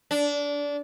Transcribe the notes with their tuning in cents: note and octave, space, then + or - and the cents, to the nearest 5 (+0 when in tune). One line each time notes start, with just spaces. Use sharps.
D4 -20